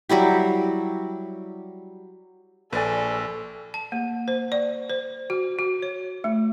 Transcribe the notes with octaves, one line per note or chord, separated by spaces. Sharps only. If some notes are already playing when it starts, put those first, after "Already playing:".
F#3 G3 E4 G4
A#1 A4 B4 D5 G#5
A5
A#3
C5
D5
C5
F#4
F#4
C#5
A3